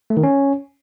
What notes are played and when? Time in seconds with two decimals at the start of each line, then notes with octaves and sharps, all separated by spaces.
0.10 A3
0.17 D#3
0.23 C#4